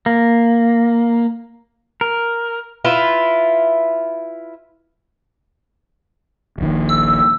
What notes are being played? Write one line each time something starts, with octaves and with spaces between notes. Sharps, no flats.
A#3
A#4
E4 F4 B4
D#1 A#1 D#3
E6